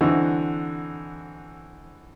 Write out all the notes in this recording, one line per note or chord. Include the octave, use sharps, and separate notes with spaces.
D3 E3 C4 D4 D#4 F#4